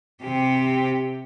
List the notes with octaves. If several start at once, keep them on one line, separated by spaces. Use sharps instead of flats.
C3 G4